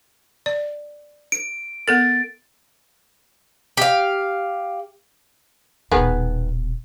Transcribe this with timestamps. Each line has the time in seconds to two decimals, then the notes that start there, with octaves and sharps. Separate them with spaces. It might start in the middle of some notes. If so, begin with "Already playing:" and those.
0.46 D5
1.32 D7
1.88 B3 A4 A#4 A6
3.77 G4 F5
5.92 D#1 B2 D#3 B3 G#4